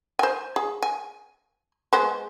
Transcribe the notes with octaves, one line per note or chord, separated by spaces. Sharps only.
C5 G#5
G#4
G#5
G#3 B3 C5